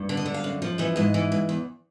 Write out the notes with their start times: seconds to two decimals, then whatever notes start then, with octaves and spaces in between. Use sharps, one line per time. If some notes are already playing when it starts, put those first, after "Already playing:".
Already playing: G2
0.09 D3
0.17 D#5
0.26 D3
0.34 F5
0.44 F#2
0.62 F3
0.78 E3 D#5
0.96 G#2 D#5
1.14 E3
1.32 G#2
1.49 E2